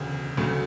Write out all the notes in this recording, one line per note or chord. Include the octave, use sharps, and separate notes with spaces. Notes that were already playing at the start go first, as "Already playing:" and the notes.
Already playing: E1 D2 C#3
D2 C#3 F#3 A3